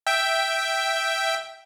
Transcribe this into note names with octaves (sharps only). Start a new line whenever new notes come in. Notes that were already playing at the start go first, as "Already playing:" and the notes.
E5 G5